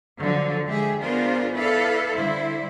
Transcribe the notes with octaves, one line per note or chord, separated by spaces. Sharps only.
D3 F3 F#3
D3 G#3 G4 G#4 E5
B3 D4 F4 G#4 A#4 C5
E4 A4 B4 D5 F5
D3 G3 E4 C5